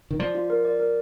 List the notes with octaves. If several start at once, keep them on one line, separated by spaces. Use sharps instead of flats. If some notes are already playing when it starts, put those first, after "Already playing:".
D#3
F3 D5
F4
A#4
D5
A#4